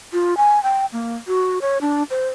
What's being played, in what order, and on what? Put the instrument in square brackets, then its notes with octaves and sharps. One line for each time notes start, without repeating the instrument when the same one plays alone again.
[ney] F4
G#5
G5
A#3
F#4
C#5
D4
C5